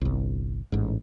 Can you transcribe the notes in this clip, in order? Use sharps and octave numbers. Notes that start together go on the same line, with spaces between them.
G1 C2
A1 G#2